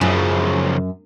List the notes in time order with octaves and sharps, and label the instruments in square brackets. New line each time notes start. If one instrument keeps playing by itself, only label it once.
[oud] F#2 [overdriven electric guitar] C#3 F3